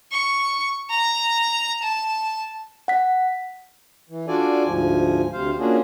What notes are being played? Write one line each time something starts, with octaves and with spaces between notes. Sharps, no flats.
C#6
A#5
A5
F#5 B6
E3
D4 F4 F#4 A4 D5 G#5
D2 G#2 F3 G#5
D2 C3 C5 F5
A#3 C#4 D4 F4 F#4 G#4